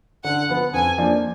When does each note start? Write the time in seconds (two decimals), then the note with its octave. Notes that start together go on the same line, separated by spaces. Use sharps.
0.24 D3 F#5
0.49 F3 B3
0.73 F2 G#5
0.98 F3 A#3 D4